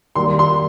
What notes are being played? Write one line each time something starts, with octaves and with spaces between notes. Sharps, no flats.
D#3 G3 A#3 C6
C6